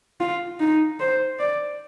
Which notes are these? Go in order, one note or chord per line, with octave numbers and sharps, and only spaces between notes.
F4
D#4
C5
D5